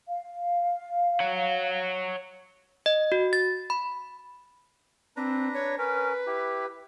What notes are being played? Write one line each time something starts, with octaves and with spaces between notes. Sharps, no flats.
F5
C#5 F#5
D#5
F#4
A6
B5
C4 D4 B4 A#5
C#5
C#4 A#4 B4
E4 G4